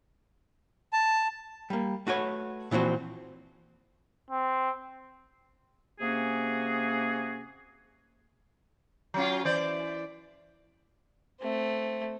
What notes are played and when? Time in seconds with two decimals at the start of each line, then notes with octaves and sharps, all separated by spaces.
0.93 A5
1.70 G3 A#3
2.07 A3 F#4 B4 C#5
2.71 A#2 E3 F3 C4 F#4
4.30 C4
6.00 C3 A#3 C#4 F#4 G#4
9.14 F#3 C#4 F4
9.45 E3 C5 D5
11.40 A3 C4